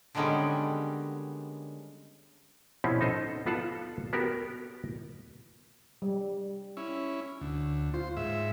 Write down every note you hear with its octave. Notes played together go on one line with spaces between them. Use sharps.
D3 D#3 G3 G#3 B3 C#4
B2 F3 C4 C#4 E4
D#4 A4 C5 D#5
B3 F4 A4 F#5 A5
B3 F#4 G4 A4 A#4
G3
C#4 E4
D2
F4 C5
G#2 E5